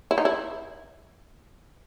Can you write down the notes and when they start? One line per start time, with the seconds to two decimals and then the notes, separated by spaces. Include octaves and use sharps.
0.11 E4
0.18 D#4
0.25 E4